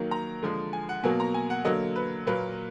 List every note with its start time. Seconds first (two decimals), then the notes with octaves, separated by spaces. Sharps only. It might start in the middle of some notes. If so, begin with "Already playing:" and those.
Already playing: D#3 F#3 A#3
0.11 A#5
0.43 D3 F3 G#3
0.73 G#5
0.89 F#5
1.04 B2 F#3 A#3 G#5
1.20 A#5
1.34 G#5
1.50 F#5
1.65 D3 F#3 A#3 D#5
1.96 B4
2.27 A#2 F#3 A#3 B4